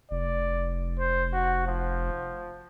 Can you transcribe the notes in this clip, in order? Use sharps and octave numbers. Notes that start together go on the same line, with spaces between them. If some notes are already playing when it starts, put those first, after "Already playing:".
F1 D5
C5
F#4
F3